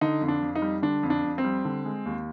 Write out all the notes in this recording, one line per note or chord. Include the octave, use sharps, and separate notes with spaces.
D3 D#4
F2
D4
F2
D#4
G3
D3 D4
F2
D4
F2
C4
G3
D3
G#3
D#2